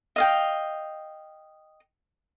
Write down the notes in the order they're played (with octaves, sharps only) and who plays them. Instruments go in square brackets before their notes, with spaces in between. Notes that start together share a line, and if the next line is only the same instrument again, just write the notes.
[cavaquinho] D#5 F5 G5